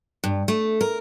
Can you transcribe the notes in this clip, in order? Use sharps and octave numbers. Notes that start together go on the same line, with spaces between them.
G2
A3
A#4